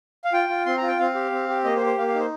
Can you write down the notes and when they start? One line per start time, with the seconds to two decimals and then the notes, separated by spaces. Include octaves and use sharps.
0.25 F5
0.33 F4 G5
0.49 F4
0.66 C4 C6
0.77 F4 A#5
0.88 G5
0.99 C4 F5
1.15 G4
1.32 C4
1.49 G4
1.64 A#3 D#5
1.76 C5
1.80 G4
1.86 C5
1.98 A#3 F5
2.08 F5
2.14 D#4
2.20 C5